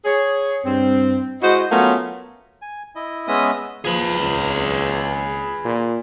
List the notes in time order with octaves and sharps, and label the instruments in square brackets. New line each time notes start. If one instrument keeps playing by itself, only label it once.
[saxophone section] G#4 C#5
G2 C4
G#3 E4 F#4 C5 D#5
F#3 A3 B3 C#4 F4 A#4
[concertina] G#5
E4 D#5
G#3 B3 C#4 D#5 E5 D#6
[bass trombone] F3 [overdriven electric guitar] G#4 B4
[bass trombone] C#2
A#2